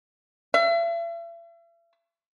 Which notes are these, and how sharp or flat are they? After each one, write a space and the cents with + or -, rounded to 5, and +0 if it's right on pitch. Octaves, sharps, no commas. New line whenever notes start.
E5 +40